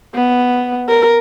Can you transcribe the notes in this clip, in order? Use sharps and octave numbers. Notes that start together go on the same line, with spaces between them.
B3
A#4